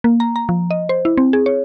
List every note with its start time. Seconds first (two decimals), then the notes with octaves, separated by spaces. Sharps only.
0.04 A#3
0.20 A#5
0.36 A#5
0.49 F3
0.71 D#5
0.89 C5
1.05 E4
1.18 C4
1.33 G#4
1.46 C#5